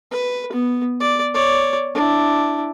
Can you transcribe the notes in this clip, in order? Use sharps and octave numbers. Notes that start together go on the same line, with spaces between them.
B4
B3
D5
C#5 D5
D4 E4